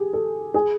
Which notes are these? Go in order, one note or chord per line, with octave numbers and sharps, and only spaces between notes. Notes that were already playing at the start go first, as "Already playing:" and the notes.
Already playing: G4 G#4
A4
G#4